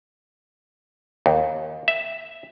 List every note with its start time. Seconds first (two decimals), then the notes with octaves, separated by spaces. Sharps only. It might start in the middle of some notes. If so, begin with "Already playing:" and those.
1.26 D#2
1.88 E5